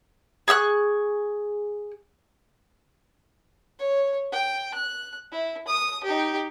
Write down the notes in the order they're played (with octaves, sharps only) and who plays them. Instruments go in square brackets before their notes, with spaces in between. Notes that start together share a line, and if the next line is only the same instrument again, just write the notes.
[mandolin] G#4 C#6 E6 F#6
[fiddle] C#5
G5
F#6
E4
D#6
D#4 G4